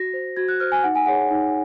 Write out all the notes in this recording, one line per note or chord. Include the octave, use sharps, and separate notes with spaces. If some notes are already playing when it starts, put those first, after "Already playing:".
Already playing: F#4 A#6
C5
F#4 G#6
F#6
C5 F6
G#5
D#4 F#5
G#5
G#4 C#5 F#5
D#4